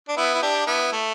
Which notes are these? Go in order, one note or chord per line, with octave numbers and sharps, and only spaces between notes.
D4
B3 E4
E4
D4 G4
B3 E4
A3